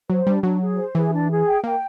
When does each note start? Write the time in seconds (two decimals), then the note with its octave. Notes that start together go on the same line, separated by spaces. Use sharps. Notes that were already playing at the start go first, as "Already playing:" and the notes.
0.10 F#3 C5
0.26 G3 D4
0.43 F#3 D4
0.61 G#4
0.77 C5
0.95 E3 G#4
1.12 D4
1.30 G#4
1.47 G5
1.64 A#3 G5